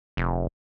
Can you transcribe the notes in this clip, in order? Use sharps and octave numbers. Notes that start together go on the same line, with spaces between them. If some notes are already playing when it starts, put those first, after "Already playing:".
F1